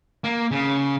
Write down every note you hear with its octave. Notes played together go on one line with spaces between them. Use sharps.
A#3
C#3